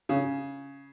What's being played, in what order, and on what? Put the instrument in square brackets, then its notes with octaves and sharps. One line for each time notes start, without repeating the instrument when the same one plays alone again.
[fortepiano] C#3